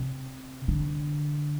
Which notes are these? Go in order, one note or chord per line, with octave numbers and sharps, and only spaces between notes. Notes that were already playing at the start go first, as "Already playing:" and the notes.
Already playing: C3
D3